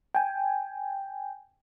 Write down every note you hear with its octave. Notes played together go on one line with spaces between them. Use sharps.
G5 G#5